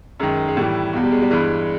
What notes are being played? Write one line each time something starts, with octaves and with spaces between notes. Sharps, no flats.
F#2 D#3 G#3
G#3
A2 E3 G3
E2 B2
G3
G#3
G3
G2 E3 G#3